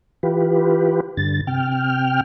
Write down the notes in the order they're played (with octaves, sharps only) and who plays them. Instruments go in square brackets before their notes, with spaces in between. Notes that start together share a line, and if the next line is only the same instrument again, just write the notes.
[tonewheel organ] E3 F4 G4 B4
G2 D3 A6
C3 G5 F6